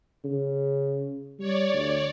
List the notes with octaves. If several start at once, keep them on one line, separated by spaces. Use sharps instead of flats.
C#3
G3 C#5 D5
D2